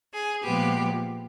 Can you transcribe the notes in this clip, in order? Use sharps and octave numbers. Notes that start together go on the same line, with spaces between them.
G#4
A#2 F3 G#3 B3 G4